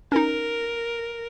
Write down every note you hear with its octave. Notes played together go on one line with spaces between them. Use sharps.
C#4 D#4 A#4